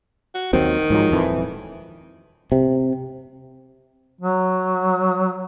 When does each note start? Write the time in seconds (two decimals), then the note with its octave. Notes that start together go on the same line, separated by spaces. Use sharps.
0.34 F#4
0.53 D#2 D#3 F#3 C4
0.90 G#2 F3 F#3
1.11 D#1 F2 E3
2.52 C3
4.21 F#3